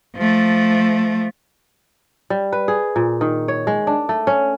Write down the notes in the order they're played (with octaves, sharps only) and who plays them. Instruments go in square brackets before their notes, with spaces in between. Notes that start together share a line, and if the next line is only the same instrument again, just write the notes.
[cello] F3 A3
[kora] G3
B4
G#4
A#2
D#3
C#5
G#3
D4
A3
C#4